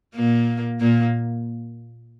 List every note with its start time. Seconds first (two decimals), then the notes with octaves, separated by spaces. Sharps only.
0.16 A#2 A#3
0.81 A#2 A#3